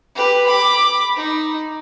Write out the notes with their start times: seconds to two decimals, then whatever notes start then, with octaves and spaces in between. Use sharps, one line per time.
0.15 G4 B4
0.47 B5 D6
1.16 D#4